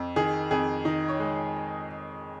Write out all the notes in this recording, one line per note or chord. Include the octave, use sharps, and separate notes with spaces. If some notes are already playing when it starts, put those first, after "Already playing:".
Already playing: F2
D#3 G#4
F2 G#4
D#3 D#4
C#5
G#3